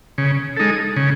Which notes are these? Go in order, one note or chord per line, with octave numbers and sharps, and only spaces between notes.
C#3
G#3 D#4 A4
C#3